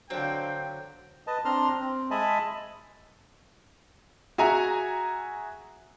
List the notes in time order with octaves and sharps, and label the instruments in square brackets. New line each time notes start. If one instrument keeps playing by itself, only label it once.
[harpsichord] D3 F#3 [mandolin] C4 [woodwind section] D4 F5 [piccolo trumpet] G5
[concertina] B4 D#5 A5
C4 D4 A#5 C6 F6
C4
G#3 D#5 E5 G#5 A5 B5
[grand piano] F#4 G#4 E5 G#5 A#5